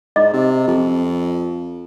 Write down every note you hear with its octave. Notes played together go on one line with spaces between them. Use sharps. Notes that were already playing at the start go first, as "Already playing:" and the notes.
G#2 D#5
C3
F2